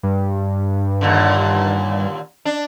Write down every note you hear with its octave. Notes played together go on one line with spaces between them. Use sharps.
G2
D#2 A#2 D3
D4